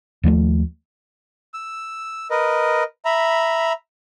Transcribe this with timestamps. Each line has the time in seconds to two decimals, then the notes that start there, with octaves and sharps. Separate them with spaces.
0.23 D#2 F3 G#3 A3
1.54 E6
2.31 A#4 B4 D#5
3.05 E5 A#5 B5